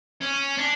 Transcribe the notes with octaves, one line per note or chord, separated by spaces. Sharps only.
C#4
D4